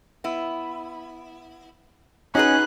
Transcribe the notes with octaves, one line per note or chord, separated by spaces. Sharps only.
B3 E4
C#4 D#4 F#4 G#4 B4 F#6